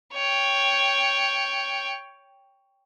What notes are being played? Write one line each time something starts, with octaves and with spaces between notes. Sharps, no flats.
C#5 G5